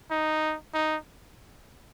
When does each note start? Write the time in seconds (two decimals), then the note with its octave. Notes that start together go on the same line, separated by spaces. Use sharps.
0.11 D#4
0.74 D#4